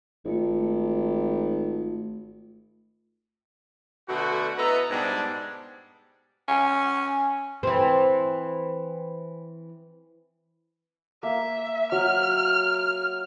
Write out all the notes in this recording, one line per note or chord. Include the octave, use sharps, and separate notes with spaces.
G#1 A3 F4
B2 D3 A3 F#4
B3 E4 A4 B4 D#5 A#5
G#2 B2 G3 B3 D4
C#4
E3 C4
A#3 E5
F#3 E5 F6